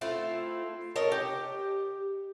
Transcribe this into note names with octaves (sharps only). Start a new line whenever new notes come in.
A3 C4 E4 F4
A4 A#4 C#5 D#5
G4